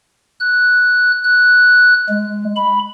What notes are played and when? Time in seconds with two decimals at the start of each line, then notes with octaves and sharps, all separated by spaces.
0.40 F#6
1.24 F#6
2.09 G#3
2.56 B5